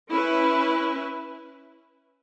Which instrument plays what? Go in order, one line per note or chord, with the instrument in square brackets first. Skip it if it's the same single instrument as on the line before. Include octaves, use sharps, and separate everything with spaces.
[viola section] C#4 E4 B4